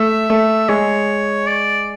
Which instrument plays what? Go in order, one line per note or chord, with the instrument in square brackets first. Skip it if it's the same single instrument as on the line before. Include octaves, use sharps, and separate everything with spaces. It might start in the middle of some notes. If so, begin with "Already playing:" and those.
Already playing: [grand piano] A3 [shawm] E5
[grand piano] A3
[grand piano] G#3 [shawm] C#5
[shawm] D5